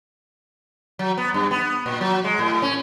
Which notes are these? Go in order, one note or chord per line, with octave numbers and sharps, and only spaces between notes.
F#3
B3
G2
B3
A#2
F#3
G#3
A2
C#4